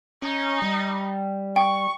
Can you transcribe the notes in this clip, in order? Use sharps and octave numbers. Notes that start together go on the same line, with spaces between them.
C#4 D#4
G3
G5 C#6